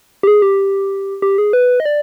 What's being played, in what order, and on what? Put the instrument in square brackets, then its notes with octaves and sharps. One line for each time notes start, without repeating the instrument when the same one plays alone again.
[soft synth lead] G4
G#4
G4
G4
G#4
B4
D#5
D5